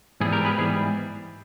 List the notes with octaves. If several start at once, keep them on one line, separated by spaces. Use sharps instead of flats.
G#2 E3 G3 B3 G#4
G4 A#4
G#4 B4
G#2 E3 G3 B3 G#4